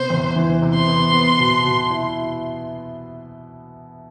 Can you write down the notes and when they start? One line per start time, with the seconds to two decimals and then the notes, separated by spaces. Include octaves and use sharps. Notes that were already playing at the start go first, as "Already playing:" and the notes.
Already playing: C3 B3 C5
0.10 E2
0.36 E3
0.62 C3
0.75 C6
0.88 B3
1.13 B3
1.39 B2
1.65 B2
1.90 E4